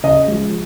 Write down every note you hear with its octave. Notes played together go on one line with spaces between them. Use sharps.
C#3 D#5
F3 G#3